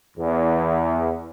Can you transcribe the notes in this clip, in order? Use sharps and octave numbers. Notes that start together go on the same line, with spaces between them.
E2